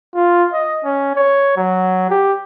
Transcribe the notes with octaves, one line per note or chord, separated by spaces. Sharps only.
F4
D#5
C#4
C#5
F#3
G4